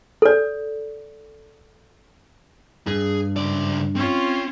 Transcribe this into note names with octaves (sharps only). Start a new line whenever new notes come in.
A4 D5
G2 G#4
C#2 D5
C4 C#4 F4